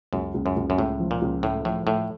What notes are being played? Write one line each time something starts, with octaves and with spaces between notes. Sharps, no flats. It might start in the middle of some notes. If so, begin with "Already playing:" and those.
C#2 F#2
C#2
F#2
C#2
F#2
C#2 A2
F3
A#2
C#2
A2 A3
A2 F3
A2 A3